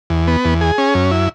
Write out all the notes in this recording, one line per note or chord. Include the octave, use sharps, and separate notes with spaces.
E2
B3
E2
G#4
C#4
F#2
E4